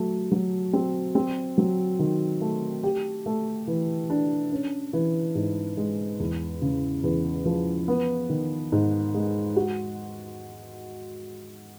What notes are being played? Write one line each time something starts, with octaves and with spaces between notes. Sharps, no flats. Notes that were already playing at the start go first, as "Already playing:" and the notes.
Already playing: F#3 A3
F#3
C4
C4
F#3
D#3
A3
G4
A3
E3
D4
C#4
E3
G#2
G#3
E2
C#3
E2
F3
B3
D#3
G#2
G#3
F#4